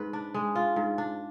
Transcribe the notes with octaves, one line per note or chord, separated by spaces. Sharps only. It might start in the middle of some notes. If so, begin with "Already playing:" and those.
Already playing: G#2 B4
D4
G#3
F4
G#2
D4